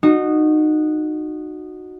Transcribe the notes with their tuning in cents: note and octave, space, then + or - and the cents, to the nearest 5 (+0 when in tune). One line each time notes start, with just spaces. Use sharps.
D#4 -20 F#4 -10